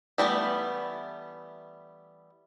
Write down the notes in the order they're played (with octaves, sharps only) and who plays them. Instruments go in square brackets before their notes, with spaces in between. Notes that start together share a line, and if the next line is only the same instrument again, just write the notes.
[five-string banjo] E3 G3 A3 B3